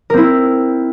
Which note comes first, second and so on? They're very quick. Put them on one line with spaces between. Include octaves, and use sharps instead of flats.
A#4 C4 E4